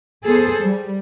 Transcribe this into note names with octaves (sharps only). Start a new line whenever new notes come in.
B3 G#4 A4 C5
G3